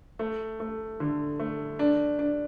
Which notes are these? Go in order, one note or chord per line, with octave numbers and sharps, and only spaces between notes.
A3
A3
D3
A3
D4
D4